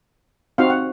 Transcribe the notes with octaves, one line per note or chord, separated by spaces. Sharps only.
C4 D#4 F#4 F5
F#5